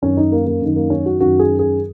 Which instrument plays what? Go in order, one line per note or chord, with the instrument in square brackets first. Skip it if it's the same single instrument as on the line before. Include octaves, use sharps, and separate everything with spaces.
[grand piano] F#2 D#3 C#4
D#4
A#3
A#3
F#2 D#3
A#3
C#4
F#4
F#2 D#3 F#4
G#4
G#4